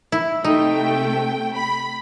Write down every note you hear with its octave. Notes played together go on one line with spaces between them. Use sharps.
E4
C3 A3 D#4 G5
B5